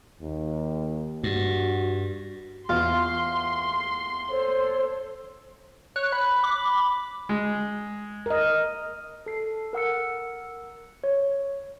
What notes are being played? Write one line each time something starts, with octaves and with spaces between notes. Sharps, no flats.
D#2
G2 F#4
E2 F4 C6
A4 C5 C#5
C#5 F#6
B5
D6
G#3
A#4 D#5
A4 C7
A#4 F#5 E6 C#7
C#5